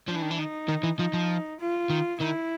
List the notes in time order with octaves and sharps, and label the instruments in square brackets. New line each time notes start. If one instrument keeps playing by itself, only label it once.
[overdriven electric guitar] F3 [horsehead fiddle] D4
[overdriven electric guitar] E3
D#3
E3
[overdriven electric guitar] D#3 [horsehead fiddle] D#4
[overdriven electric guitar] D#3
E3
[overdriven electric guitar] F3 [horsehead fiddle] D#4
[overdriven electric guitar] F3
[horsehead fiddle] F4
[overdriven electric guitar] D#3
[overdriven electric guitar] D#3 [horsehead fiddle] E4